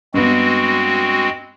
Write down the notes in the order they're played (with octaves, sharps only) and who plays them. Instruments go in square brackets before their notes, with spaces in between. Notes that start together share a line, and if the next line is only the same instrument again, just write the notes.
[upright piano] G2 B3 [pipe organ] G#3 C4 F#4